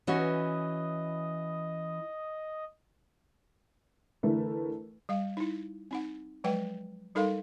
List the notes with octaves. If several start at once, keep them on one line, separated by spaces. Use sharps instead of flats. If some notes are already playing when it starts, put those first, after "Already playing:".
E3 C#4 F#4 D#5
D3 E3 A3 E4 A#4 B4
G3 F5
D#4 E4
C4 D#4 F#5
F3 F#3 G#3 B4 F#5 G5
G3 D#4 A4 A#4 F5 C6